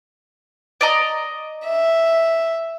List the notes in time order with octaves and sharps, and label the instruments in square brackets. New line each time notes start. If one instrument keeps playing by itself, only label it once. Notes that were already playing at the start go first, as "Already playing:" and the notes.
[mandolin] D5 D#5 A#5
[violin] E5